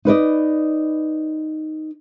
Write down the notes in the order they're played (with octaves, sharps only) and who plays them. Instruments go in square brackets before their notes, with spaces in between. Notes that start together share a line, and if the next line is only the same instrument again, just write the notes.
[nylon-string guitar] D#4 B4 D5 D#5